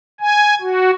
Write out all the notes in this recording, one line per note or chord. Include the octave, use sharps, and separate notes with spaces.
G#5
F#4